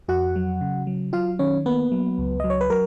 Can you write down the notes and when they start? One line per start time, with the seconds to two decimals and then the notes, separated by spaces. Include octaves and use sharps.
0.08 F2 F#4 F#5
0.36 F#3
0.61 C#3
0.87 F#3
1.13 F#3 F4 F5
1.39 D#3 C#4 C#5
1.66 A#3 B3 B4
1.92 F#3
2.18 C#2
2.40 F#3 D#5
2.50 C#5
2.61 B4
2.70 F#3 A#4